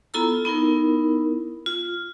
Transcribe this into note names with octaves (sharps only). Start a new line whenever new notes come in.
B3 E4 F4 A4 A#5 E6
B3 D#4 E4 A#4
F4